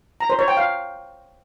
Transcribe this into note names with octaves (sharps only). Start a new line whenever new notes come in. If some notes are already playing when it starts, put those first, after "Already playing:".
A#5
C5
C#5
G5
F5